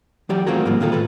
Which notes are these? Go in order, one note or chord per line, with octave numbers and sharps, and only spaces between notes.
E3 F#3 G4 D5
A3 C4 F4 F#4 G#4 A#4
G#2 F3 G3 A#3 C4
A#2 D#3 F4 G4 A4
A2 A4 B4